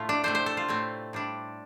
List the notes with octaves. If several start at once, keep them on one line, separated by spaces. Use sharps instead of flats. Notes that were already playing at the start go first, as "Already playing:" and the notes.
Already playing: A2 A3 F4
D4
C3 A3 D4 C5
C5
A4
F4
A2 A3 C4
A2 G3 D4